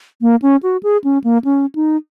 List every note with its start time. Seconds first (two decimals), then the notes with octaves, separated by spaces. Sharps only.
0.22 A#3
0.42 C#4
0.63 F#4
0.83 G#4
1.04 C#4
1.24 A#3
1.45 C#4
1.75 D#4